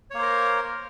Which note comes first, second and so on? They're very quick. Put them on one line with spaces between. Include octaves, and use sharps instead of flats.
C#5 A#3 C5 A#4